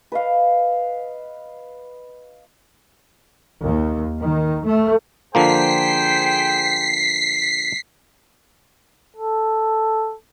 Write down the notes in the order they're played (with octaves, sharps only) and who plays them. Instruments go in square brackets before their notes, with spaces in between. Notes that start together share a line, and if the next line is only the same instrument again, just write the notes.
[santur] B4 D#5 F5
[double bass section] D#2
D#3
A3
[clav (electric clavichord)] D3 F3 A#3 [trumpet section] G#4 C5 G5 [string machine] B6 C7
[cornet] A4